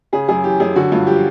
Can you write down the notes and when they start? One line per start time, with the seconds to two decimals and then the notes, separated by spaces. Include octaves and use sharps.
0.13 C#3 G#4
0.29 F#2 G#4
0.44 E3 G4
0.60 F#2 G#4
0.76 D3 F#4
0.92 G2 F4
1.07 F3 G4